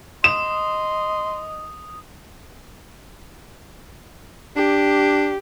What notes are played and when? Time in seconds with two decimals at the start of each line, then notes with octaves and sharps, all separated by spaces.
0.24 D#5 C6 D#6 E7
4.56 D4 G4